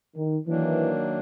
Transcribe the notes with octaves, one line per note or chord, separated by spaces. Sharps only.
D#3
D#3 E3 F#3 A#3 D4